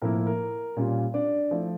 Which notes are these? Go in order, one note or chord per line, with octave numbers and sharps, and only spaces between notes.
A2 F3 A#3 E4 A#4
A#4
A#2 G3 C#4 F4
D4 D5
F3 A3 E4